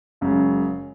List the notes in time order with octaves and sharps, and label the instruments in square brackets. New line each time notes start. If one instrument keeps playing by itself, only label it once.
[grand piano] F#1 F#2 C#3 G#3